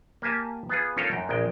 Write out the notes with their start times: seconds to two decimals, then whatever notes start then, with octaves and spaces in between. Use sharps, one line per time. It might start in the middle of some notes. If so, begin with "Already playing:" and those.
0.22 A#3 G4 G#5 A5
0.69 B3 F4 G#4
0.97 C#4 D#4 F4 A4 A#4 C#5
1.11 F#2 G5
1.29 A#1 G#3 G5